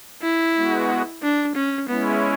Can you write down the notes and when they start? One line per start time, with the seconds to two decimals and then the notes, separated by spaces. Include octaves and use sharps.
0.22 E4
0.56 G#3 B3 F#4
1.22 D4
1.55 C#4
1.89 G#3 B3 C#4 E4